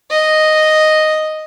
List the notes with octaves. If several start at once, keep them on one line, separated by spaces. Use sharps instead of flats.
D#5